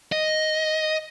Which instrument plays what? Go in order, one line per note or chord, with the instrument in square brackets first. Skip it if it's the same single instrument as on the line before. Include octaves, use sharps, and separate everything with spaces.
[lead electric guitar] D#5